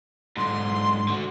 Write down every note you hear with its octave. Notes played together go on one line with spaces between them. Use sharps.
G#2 D3 C6
D3 F#4